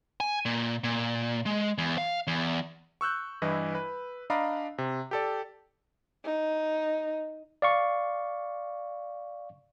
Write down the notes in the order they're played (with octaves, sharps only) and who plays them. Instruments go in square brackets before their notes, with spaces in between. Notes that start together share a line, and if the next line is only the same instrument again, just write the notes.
[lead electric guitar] G#5
A#2
A#2
G#3
E2
F5
E2
[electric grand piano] C#6 E6 F#6 G6
G2 E3 E4 D#5
B4
D4 D5 D#5 F5 A#5 B5
C3
G4 A4 D5
[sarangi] D#4
[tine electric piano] D5 F5 C#6